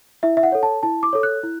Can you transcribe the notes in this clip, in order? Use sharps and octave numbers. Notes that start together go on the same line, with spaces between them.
E4 E5
E5
F#5
A4 C#5
A5
E4 A5
D6
A4 C#5
F#6
E4